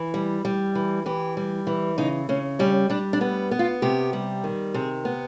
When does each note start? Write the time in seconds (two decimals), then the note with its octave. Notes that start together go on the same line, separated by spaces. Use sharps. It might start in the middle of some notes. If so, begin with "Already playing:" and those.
Already playing: E3
0.14 G3
0.45 G3
0.75 E3
1.06 E3 G4
1.37 G3
1.67 E3
1.98 C#3 D#4
2.29 C#3 C#4
2.59 G3 C#4
2.90 G3 D4
3.13 D4
3.21 B3
3.51 B3
3.59 F4
3.82 C3 G4
4.13 G3
4.44 D#3
4.74 C3 G#4
5.05 B3